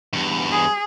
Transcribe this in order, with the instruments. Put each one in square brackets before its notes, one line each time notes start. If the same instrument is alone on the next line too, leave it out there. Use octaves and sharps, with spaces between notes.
[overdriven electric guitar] E2 G2
[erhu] G#4